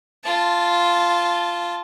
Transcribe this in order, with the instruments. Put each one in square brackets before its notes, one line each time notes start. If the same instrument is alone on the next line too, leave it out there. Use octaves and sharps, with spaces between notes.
[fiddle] F4 A5